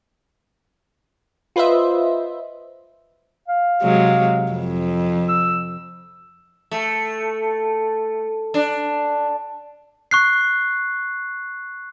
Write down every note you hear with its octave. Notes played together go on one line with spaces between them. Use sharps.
F4 B4 C5 D#5 E5
F5
C3 F#3 G#3
F2
E6
A3
D4
C#6 F#6 C7